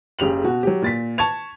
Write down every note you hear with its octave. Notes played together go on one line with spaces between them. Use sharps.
F#1 C#3 G4 F7 F#7
B2 F#4
F#3 G4
A#2 A6 B6
A5 C#6 G#6 F7